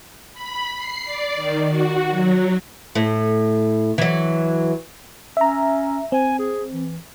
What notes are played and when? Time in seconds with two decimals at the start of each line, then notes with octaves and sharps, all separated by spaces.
0.33 B5
0.76 C7
1.05 D5
1.36 D#3
1.69 F#4
2.11 F#3
2.95 A2
3.98 E3 F#3
5.37 C#4 E5 A#5
6.12 C4 G#5
6.39 G#4
6.72 E3